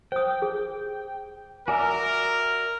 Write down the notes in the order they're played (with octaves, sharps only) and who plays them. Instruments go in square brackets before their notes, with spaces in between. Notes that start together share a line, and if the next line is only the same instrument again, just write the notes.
[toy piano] C5 D#6 [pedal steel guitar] G5
[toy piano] G#4
[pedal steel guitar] F#4 D5 E5 [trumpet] A#4 [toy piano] G#5 D6